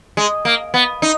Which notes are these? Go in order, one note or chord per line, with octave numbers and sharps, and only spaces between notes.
G#3
A#3
B3
D#4